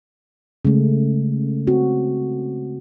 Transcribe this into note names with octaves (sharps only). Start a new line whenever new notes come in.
C#3 G#3 A3
C4 F#4